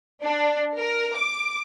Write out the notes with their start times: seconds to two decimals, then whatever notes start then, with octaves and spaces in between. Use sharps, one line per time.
0.23 D4
0.75 A#4
1.15 D6